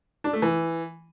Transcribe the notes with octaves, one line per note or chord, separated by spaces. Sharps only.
D4
A3
E3